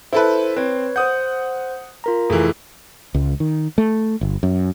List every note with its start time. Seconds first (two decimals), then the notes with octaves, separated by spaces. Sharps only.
0.13 E4 A4 B4 C5
0.56 C4 B4 C#5
0.96 C5 F#5 D#6 G6
2.04 F4 A#4 A#5
2.30 F1 E3 G#4
3.14 C#2
3.40 D#3
3.78 A3
4.21 G1
4.43 F#2